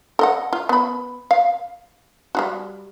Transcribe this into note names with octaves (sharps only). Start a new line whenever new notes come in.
A4 D#5 F#5
F4
B3 B5
F5
G3 F4 F#4